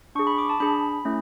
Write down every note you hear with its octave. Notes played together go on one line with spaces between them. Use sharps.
D4 G#4 C#6
B5
D6
A5
D4 G#4 B5
A3 C#4 E4